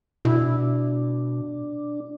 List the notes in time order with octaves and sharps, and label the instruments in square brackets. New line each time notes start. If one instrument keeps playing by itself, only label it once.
[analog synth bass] B2 [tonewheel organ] D4 [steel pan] E4